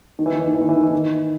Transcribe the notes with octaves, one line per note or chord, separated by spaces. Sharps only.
D#3
E3
D#3
E3
D#3
E3
D#3
E3
D#3
E3
D#3